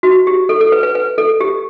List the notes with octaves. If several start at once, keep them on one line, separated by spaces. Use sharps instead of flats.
F#4
G4
A4
A4
B4
B4
B4
A4
G4